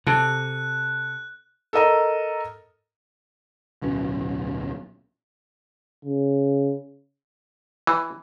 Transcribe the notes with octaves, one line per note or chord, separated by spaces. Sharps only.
C3 A4 F#6
A4 A#4 D#5 A#5
D1 B1 B2 C#4
C#3
E3